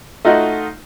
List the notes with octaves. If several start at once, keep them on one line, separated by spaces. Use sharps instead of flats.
A3 D#4 F4 F#4 D#5